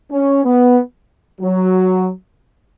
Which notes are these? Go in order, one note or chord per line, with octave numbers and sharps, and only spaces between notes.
C#4
B3
F#3